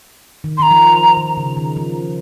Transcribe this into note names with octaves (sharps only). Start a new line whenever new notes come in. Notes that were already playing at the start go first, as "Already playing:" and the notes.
D#3
D#3 A#5 C6
F3
D#3
C#3
D#3
F3